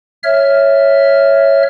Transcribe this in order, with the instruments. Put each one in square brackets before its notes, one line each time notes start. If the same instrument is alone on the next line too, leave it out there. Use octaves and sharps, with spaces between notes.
[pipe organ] C#5 E5 F6